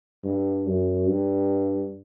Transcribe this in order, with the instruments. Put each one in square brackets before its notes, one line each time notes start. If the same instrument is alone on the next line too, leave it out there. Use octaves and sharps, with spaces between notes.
[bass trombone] G2
F#2
G2